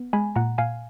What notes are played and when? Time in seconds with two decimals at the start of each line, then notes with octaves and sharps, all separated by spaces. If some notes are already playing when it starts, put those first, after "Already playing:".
Already playing: B3
0.13 G#3 G#5 B5
0.36 A#2 F#5 A#5
0.58 A#2 F5 G#5